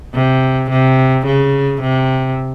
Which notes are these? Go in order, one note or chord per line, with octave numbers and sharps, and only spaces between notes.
C3
C3
C#3
C3